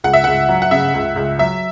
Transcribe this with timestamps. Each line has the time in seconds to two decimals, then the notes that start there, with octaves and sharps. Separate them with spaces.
0.04 C#2 F#5
0.13 E5
0.24 C#2 F#5
0.49 F#3
0.62 F#5
0.71 C#3 E5
0.94 C#2
1.16 C#2
1.39 F#3 E5